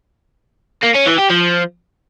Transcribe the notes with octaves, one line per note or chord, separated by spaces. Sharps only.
A#3
C#4
E3
G4
F3